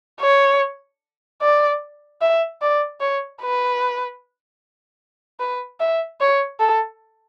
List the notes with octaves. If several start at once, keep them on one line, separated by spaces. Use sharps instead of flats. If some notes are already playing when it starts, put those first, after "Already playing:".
C#5
D5
E5
D5
C#5
B4
B4
E5
C#5
A4